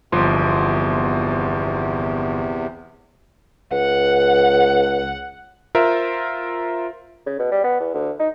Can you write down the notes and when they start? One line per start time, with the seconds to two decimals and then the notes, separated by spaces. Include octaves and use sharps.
0.12 G1 E2 C3 F3 C6
3.72 C#2 F#5
5.75 F4 A#4 C5 E5
7.26 C#3
7.39 B2
7.52 G3
7.64 B3
7.80 E2
7.94 D2
8.20 D#4